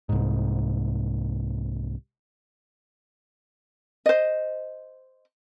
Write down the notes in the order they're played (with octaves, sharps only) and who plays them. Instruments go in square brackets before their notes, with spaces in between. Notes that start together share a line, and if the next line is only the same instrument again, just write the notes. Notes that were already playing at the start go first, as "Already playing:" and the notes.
[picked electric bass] C2 G#2
[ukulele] C5 D#5